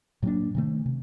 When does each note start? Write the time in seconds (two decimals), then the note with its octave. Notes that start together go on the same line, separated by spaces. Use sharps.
0.22 A2 F#3 A#3 D4
0.55 C3 D#3 A3
0.86 C3